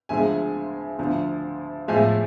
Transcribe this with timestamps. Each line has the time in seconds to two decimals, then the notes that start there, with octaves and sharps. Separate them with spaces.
0.09 D2 D3 F3 G#3 E5 G#5
0.99 D2 D3 F3
1.88 A2 F3 G#3 E5 G#5